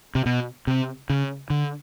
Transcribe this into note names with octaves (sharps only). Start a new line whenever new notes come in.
C3
B2
C3
C#3
D3